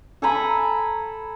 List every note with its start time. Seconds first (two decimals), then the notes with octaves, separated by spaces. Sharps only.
0.22 A4 G#5 A#5 B5